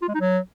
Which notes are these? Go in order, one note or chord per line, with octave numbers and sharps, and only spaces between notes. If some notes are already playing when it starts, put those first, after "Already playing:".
F4
G#3
D#4
F#3